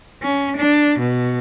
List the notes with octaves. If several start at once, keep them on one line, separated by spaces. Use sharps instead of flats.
C#4
D4
B2